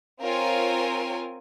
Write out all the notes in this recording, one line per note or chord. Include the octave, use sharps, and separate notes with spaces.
C4 F4 A#4 C#5 G#5